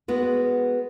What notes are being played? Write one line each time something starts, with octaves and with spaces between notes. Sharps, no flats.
G#3 B3 F#4